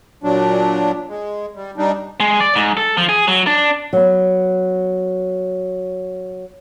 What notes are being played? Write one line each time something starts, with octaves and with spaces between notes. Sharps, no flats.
A#2 F#3 D4
G#3
G3
G3 D4 D#4
G#3
D5
G#2
A4
F3
G#4
F#3
D4
F#3 B3